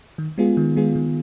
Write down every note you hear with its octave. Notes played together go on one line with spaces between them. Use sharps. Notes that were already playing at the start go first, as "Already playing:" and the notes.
D#3
G#3 B3 F4 G#4
D#3
G#3 B3 F4 G#4
D#3